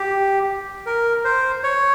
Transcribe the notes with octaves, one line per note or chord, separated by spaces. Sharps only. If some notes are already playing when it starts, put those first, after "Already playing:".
Already playing: G4
A#4
C5
C#5